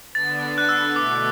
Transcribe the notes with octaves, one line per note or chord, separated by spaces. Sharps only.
D3 B3 D4 A6
F#6
E6
B2 A3 E4 D6